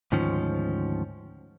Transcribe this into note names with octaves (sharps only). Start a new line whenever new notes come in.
D2 G#2 D#3 F3 C#4